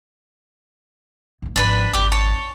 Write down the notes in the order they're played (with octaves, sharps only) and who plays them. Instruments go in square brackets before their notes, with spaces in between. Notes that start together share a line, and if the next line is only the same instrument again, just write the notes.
[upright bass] G#2 A#3
[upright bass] G#1 F3 [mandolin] D4 B4 B5
[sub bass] G#1 [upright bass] F2 D#4 [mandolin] G4 D6
[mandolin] C#5 A5